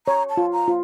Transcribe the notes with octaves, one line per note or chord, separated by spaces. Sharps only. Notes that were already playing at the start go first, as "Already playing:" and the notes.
C#5 A#5
A5
F4
A#5
F4